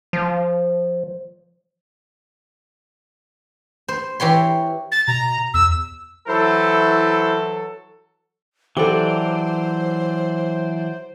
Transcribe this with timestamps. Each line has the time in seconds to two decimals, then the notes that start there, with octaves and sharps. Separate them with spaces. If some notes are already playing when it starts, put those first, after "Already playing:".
0.13 F3
3.88 C5
4.20 E3 G4 C#5 C6
4.92 A6
5.08 B2 A#5
5.54 E2 E6
6.28 E3 F#3 E4 A4 C5
8.77 E3 F#3 G4 A4 C5 D5